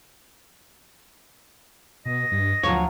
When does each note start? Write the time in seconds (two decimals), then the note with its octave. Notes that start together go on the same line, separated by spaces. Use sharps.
2.05 B2 D#5
2.31 G2
2.63 D2 F3 F#3 F4 C#5